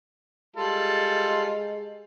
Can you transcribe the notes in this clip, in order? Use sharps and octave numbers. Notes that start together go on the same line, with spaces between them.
G3 G#3 F4 A4